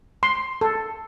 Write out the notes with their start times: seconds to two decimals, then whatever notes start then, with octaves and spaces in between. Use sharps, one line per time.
0.23 C6
0.61 A4